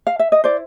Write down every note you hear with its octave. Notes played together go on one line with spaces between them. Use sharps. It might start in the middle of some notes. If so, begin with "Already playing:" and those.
F5
E5
D#5
E4 C5 D5